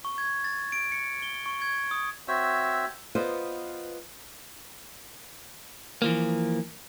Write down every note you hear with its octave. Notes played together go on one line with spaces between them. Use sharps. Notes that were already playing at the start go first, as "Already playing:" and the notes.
C#6
G#6
A6
D7
C#7
G7
C#6
G#6
D#6
C4 F#4 C5 C#5 E5 E6
B3 F4 B4 C5 D5 D#5
E3 F3 A#3